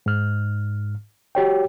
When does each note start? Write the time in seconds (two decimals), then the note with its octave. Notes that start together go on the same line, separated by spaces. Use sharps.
0.06 G#2 F6
1.35 F#4 G4 C#5 G5